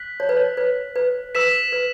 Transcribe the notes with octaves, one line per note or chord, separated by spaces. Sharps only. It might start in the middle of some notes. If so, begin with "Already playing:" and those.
Already playing: F#6 B6 F#7
C#5
B4
C#5
B4
B4
B4 E6 B6 E7
B4